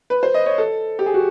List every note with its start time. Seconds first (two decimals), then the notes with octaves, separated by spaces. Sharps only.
0.10 B4
0.23 C5
0.34 D#5
0.46 C#5
0.58 A4
0.99 G4
1.06 G#4
1.14 F#4